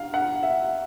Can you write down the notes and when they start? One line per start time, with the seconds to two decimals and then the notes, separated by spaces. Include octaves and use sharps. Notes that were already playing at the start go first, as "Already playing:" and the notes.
Already playing: F5
0.14 F#5
0.43 E5